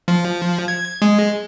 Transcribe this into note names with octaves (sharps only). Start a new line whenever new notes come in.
F3
G#6
G#3